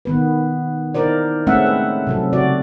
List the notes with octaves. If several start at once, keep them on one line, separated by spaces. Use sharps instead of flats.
D#3 B3 B4
D#4 E4 A#4 C5 D5
G#3 A3 C4 C#4 E5 F#5
B4
C3 F#3 A4
C#3 F#4 D5